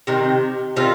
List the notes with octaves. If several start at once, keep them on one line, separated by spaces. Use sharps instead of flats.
C3 D#3
C3 D#3 G3 F4